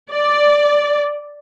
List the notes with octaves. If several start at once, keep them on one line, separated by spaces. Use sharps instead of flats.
D5